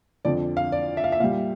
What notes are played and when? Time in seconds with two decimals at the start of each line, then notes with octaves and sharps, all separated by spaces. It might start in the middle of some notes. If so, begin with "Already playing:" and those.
0.25 F2 D3 F3 D5
0.57 F5
0.72 D5
0.97 E5
1.04 F5
1.12 E5
1.20 A#2 G3 F5